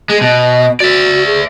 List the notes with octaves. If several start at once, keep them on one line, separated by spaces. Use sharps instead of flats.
G#3 G#4
B2 D#5
F#4 D5 E5
G#4